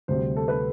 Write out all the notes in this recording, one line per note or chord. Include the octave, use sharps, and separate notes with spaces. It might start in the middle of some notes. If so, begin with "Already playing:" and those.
D2 C3 G3 C5
A4
B4